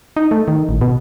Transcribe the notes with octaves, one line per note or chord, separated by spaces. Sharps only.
D#4
A3
D#3
A1
B2